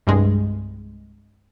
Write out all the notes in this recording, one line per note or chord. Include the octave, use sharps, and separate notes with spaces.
C2 G2 G#3